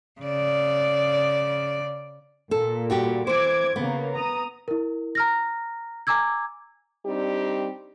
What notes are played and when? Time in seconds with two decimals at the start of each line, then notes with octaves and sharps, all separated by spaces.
0.21 C#3 D5
2.51 A#2 A4
2.90 G3 F#4 G4
3.27 E3 C5 D6 G#6
3.76 C#3 A#3 B3
4.15 A#5 D#6
4.68 E4 A#4
5.15 A#5 F6 A#6
6.07 G#5 A#5 D6 E6 G#6
7.06 G3 C4 D4 D#4 G4